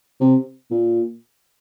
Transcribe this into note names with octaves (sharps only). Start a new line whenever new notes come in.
C3
A#2